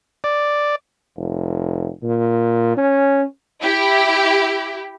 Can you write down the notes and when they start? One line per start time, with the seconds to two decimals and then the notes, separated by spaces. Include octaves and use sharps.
0.24 D5
1.17 F1
2.03 A#2
2.77 C#4
3.62 E4 G4